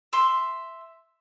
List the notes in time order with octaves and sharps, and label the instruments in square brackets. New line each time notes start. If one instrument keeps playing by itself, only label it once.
[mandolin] E5 C6